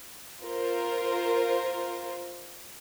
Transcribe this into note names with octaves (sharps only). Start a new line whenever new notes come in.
F4 A#4 C5